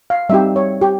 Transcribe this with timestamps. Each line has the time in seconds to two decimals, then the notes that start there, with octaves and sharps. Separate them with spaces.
0.10 F5
0.29 G3 C4 D#4 G4 E5
0.56 C#5
0.81 G4